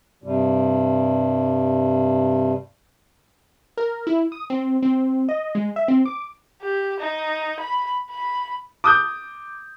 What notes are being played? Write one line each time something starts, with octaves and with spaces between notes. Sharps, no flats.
G2 C3 G3
A#4
E4
D#6
C4
C4
D#5
G#3
E5
C4
D6
G4
D#4
B5
B5
D6 D#6 G6